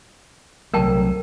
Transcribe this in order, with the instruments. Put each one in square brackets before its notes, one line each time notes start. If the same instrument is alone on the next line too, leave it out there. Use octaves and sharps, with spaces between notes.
[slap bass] C2 F#3 A3 [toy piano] A#4 G5 A5